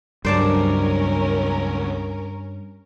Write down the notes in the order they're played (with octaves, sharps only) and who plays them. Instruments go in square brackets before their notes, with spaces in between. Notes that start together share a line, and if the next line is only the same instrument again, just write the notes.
[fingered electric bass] C#2 F#3 [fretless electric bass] G2 [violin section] C#4 A#4 [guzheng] C5 D5 A5